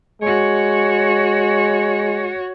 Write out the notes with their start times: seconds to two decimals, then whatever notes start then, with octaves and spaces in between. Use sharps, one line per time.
0.22 G#3 F#4 C#5